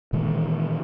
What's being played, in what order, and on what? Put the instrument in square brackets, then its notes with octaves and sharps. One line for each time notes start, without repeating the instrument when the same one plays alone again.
[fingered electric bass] A#2 D#3 E3 G#3